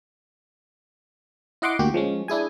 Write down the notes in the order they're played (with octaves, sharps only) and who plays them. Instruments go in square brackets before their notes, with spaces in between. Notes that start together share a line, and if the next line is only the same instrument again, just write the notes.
[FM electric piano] E4 D#5 F#5 C6 D6
D2 A#3 F#4 G4
F3 G#3 C#4
D4 E4 G#4 G#5